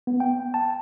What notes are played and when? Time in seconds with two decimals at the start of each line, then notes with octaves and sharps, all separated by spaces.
0.07 B3
0.20 G5
0.54 A5